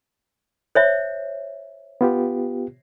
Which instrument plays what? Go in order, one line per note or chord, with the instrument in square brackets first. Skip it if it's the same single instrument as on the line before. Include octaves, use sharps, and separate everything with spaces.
[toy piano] C5 C#5 E5
[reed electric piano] B3 F4 G4